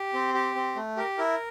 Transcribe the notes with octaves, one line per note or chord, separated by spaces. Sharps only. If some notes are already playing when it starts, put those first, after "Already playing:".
Already playing: G4
C4
G4
C4
A3
G4 A#4
E4 A#4